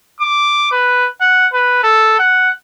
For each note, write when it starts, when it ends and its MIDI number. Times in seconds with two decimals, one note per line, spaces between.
0.21 0.68 86
0.71 1.08 71
1.21 1.47 78
1.54 1.83 71
1.83 2.18 69
2.19 2.50 78